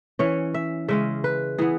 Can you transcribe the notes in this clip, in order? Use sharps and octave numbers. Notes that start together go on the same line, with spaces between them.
E3 C#4 C#5
E5
C#3 G#3 C#4 E5
B4
E3 B3 G#4